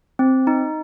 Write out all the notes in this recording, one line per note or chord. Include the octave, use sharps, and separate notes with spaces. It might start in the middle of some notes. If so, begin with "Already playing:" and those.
C4
D#4